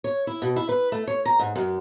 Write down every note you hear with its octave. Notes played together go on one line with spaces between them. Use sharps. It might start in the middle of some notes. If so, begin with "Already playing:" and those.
C#5
E4
B2
E4
B4
A3
C#5
A#5
G#2
F#2